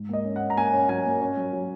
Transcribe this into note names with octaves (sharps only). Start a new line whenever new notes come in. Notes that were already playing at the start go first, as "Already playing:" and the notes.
Already playing: G#2
A#3 D#5
C#4
F#5
C#4
A#5
A#3 G#5
C#4
F#3 G#5
A#3
C#4
F#3
F#3